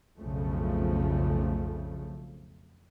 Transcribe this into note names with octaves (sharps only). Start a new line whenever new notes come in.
B1 F2 C#3 F3 A3